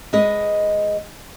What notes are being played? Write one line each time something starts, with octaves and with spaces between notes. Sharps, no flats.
G#3 B4 D#5